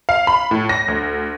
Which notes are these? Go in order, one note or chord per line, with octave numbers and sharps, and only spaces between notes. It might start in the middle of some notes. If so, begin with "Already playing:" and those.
F5
B5
A2
A#6
D2